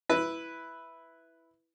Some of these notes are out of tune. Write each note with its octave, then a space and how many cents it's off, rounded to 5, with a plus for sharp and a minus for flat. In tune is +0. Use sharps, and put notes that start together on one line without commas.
E4 +0 B4 +0